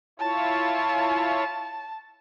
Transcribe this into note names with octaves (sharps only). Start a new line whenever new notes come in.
E4 F4 C#5 A5